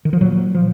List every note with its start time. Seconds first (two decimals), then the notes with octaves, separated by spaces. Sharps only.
0.05 D#3
0.13 F3
0.21 A#2 F#3
0.55 F3